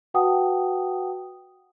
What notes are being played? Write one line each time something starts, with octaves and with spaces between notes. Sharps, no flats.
F#4 B4 F#5 G5 A5 D#6